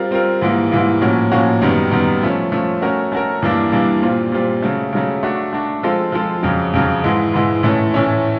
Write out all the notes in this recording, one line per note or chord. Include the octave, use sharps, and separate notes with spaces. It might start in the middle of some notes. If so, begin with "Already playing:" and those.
Already playing: G3 C4 F4 A#4
G3 C4 F4 A#4
G#2 E3 G3 A#3
G#2 E3 G3 A#3
A2 F3 A#3 C#4 F#4
A2 F3 A#3 C#4 F#4
F#2 D#3 G3 B3
F#2 D#3 G3 B3
F3 A3 C#4
F3 A3 C#4
A3 C#4 F#4 A#4
A3 C#4 F#4 A#4
G2 E3 G3 A#3 D4
G2 E3 G3 A#3 D4
A#2 G3 C4 F4
A#2 G3 C4 F4
C#3 F#3 A3
C#3 F#3 A3
A3 D4 F#4
A3 D4 F#4
F3 G#3 C4 F4 A4
F3 G#3 C4 F4 A4
F2 C#3 F#3
F2 C#3 F#3
G#2 E3 G#3
G#2 E3 G#3
A2 E3 A3 C#4
A2 E3 A3 C#4